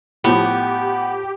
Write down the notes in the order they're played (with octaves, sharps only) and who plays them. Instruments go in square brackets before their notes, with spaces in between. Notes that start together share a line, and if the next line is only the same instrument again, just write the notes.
[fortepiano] A2 F3 [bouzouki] B3 [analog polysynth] G4